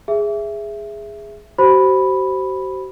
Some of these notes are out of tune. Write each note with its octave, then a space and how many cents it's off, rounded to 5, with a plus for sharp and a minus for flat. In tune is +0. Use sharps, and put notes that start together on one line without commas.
G#4 -5 E5 +10
F#4 +45 C5 +0 B5 +0